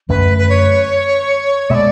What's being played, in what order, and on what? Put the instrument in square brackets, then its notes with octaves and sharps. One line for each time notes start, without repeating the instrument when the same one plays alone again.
[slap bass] F#2 D3 A3 C#4 [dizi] B4
[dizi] B4
C#5
[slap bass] B2 G#3 B3 [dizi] D5 E5